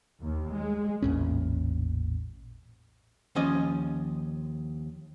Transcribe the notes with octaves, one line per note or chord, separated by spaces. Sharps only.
D#2
G#3
A1 E2 A#2 C#4
D#2 F3 C#4 D#5